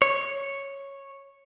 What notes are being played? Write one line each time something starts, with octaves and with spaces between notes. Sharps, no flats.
C#5